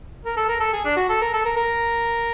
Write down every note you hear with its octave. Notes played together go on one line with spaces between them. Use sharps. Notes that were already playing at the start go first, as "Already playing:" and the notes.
A#4
A4
A#4
A4
G#4
D4
F#4
A4
A#4
A4
A#4
A#4